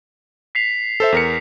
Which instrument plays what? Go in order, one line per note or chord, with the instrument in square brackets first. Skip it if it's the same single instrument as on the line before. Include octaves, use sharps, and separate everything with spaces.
[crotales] B6 C7 F7
[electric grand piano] A4 C5 E5
E2 A#4 C#7